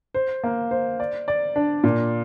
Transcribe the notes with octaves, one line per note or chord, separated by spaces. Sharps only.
C5
A#3
C5
D5
D5
D4
A#2